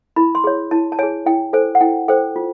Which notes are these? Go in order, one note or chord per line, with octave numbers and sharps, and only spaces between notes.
E4 B5
C6
G#4 C#5
E4 A5
A5
G#4 C#5 G#5
E4 G5
A4 C5 G#5
F#5
E4 G5
A4 C5 G5
F4